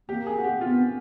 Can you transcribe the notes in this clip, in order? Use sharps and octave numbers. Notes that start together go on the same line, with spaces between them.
A#3 G4
G#4
F#4
G4
B3 F4